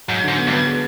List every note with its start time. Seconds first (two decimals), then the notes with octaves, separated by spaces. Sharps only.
0.08 G#2 F#3
0.24 G#2 D3
0.38 B3
0.48 G2
0.53 B3
0.66 G#3